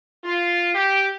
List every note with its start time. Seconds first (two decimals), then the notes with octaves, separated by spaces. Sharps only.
0.24 F4
0.74 G4